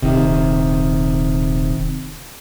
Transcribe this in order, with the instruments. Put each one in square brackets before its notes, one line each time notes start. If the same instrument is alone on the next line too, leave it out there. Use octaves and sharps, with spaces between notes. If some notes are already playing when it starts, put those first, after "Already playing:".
[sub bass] D#1 [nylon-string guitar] C3 D#3